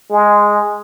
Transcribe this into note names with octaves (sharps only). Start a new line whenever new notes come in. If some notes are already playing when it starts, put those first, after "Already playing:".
G#3